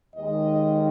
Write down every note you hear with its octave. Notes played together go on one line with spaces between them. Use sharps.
D#2 D#3 G#3 D#5